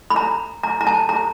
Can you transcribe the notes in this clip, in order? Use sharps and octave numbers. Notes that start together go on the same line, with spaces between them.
B5
A#5
A#5
A#5
A5
A#5